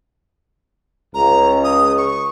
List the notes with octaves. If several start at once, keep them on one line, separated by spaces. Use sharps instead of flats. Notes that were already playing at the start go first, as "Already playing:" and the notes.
C#2 A#5
D#6
C#6